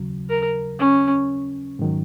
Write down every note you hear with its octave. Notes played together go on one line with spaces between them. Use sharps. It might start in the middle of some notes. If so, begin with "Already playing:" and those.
Already playing: D#2 C#3 F#3
A#4
C#4
G#2 D#3 F#3